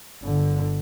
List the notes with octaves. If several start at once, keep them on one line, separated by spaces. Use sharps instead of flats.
G1 D3